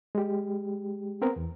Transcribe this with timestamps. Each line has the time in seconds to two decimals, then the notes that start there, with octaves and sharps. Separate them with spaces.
0.15 G#3 G4
1.22 B3 C4 A#4
1.36 E2